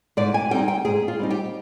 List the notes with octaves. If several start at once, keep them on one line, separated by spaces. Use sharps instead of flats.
G#2 D5
G#5
G3 C4 D#4 G5
G5
G#2 G#4
F4
G3 C4 D#4
G4